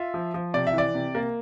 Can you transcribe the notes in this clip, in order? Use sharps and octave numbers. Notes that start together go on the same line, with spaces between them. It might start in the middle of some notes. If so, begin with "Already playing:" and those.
Already playing: F4 E5
F3
F3
C3 D5
E5
E3 D5
C3
A#3